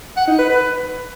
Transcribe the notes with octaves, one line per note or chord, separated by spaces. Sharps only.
F#5
D#4
B4
B4